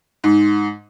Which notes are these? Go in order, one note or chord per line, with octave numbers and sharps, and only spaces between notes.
G#2